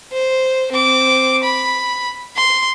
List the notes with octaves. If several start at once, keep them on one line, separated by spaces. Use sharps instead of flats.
C5
C4 D6
B5
C6